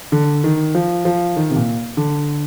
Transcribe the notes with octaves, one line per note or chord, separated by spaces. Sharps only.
D3
D#3
F3
F3
D#3
C3
A#2
D3